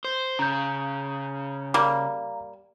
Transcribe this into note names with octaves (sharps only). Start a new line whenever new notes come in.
C5
C#3 A#5 G6
G3 A#3 F5 A#5